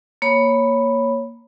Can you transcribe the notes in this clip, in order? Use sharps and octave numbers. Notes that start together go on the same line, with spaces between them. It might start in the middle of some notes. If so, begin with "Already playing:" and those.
A#3 C#5 B5